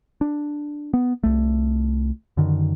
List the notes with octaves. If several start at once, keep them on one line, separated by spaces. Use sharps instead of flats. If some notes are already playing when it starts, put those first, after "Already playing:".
D4
B3
C2 A3
F#2 D3 D#3